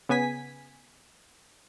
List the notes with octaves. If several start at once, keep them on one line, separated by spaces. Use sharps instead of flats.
C#3 B3 G#5 B6